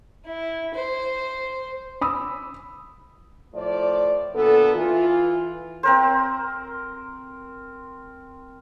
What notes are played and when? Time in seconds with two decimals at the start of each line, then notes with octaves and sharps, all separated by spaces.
0.25 E4
0.74 C5
2.01 B5 D#6 E6
3.54 A2 F3 D5
4.34 A#2 D3 B3 A4
4.74 E3 F4
5.83 C4 A#4 C5